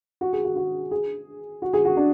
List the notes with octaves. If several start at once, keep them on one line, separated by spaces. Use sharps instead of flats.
F#4
G#4
F#4
F#4
G#4
F#4
G#4
F#4
D4